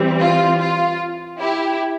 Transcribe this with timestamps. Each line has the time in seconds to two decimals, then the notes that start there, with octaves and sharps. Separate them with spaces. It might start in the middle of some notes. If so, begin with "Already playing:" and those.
Already playing: E3 G3 C4
0.19 F4
0.59 F4
1.40 E4 G4